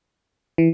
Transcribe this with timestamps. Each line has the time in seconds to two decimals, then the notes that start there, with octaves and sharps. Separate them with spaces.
0.58 E3